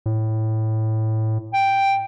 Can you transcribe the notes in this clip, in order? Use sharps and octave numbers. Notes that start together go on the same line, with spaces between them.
A2
G5